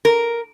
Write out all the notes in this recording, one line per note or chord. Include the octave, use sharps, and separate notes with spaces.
A#4